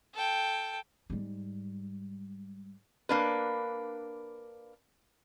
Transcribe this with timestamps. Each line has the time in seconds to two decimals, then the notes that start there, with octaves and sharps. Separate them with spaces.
0.14 A4 G5
1.10 G#2 G3
3.09 A#3 D4 B4